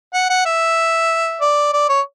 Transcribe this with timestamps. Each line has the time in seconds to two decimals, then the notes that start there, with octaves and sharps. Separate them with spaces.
0.14 F#5
0.30 F#5
0.46 E5
1.41 D5
1.73 D5
1.89 C#5